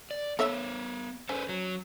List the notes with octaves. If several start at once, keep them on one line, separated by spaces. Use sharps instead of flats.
D5
B3 A4 A#4 C#5 E5
C#4 A4 B4 C5
F#3